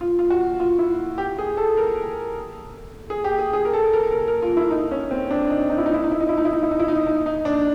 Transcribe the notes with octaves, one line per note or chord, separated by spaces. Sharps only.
F4
F4
F#4
F4
E4
G4
G#4
A4
A#4
G#4
G4
G#4
G#4
A#4
A4
A#4
A#4
A#4
F4
E4
D#4
C#4
C4
D4
D#4
D#4
E4
D#4
E4
D#4
E4
D#4
E4
D#4
E4
D#4
E4
D#4
E4
D#4
D#4
D#4
D4